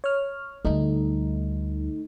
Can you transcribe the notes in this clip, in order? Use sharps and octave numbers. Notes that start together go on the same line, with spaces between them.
C#5 F6
D2 G3 A3 D#4